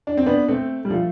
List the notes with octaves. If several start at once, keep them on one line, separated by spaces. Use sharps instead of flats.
D4
C4
B3 D4
A3 C4
G3
F3 A3